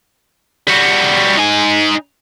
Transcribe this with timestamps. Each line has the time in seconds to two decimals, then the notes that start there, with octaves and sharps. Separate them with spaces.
0.68 G3 F#4
1.38 D#4 G#5